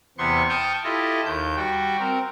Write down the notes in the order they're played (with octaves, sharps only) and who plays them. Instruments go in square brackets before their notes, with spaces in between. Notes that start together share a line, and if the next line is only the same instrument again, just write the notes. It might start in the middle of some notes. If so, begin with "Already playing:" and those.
[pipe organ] E2 C3 B3 C6 C#6
G5 A5 C#6 D#6 F6 G6
E4 F4 G4 A4 D#5
D#2 G6
G3 F#4 G5
C4 A#4